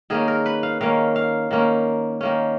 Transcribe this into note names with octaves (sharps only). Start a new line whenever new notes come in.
D#3 A#3 C#4 G#4
A#4
B4
F5
D#3 A#3 C#4 F5
F5
D#3 A#3 C#4
D#3 A#3 C#4